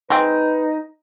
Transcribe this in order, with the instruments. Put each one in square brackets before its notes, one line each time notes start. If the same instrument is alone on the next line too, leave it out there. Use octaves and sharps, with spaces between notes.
[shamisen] G#3 C4 [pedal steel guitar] D#4 [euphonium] B4